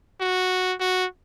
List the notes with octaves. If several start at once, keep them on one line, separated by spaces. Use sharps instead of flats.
F#4
F#4